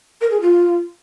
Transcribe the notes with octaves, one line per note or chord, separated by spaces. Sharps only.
A#4
G#4
F4